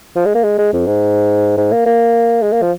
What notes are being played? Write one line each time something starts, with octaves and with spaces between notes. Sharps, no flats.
F3
G#3
A#3
G#3
G#3
F2
G#2
G#2
A#3
A#3
G#3
A#3
F3